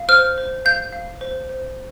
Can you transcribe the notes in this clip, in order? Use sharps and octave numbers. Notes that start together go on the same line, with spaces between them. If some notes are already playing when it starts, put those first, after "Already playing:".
Already playing: F5
C5 F6
C5
F5 G6
F5
C5
C5